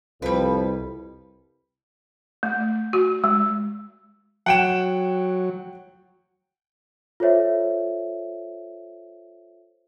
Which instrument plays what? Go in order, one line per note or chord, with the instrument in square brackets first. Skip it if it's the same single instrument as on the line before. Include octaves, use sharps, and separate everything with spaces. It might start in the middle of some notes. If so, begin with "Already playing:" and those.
[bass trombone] C2 [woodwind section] F2 [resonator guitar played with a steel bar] G3 B4
[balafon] A3
F#4
G#3
[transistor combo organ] F#3 [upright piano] F#5 G5 E7
[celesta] F4 A4 C5 C#5 E5